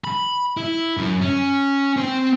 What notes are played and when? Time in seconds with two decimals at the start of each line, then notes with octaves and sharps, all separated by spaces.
0.04 B5
0.57 E4
0.97 F#2
1.21 C#4
1.97 C4 C5